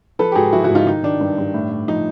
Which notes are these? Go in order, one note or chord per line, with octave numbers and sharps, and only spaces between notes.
F3 A4 B4
G4
G#2 F#4 G#4
F3 E4 F#4
E4 F#4
G#2
D#4 F4
D#3 D#4
D#3 D4
G2
G2
A2
A2
F3 D#4